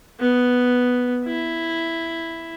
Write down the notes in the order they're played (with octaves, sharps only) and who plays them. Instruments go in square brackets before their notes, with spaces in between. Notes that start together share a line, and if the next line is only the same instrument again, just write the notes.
[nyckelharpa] B3
E4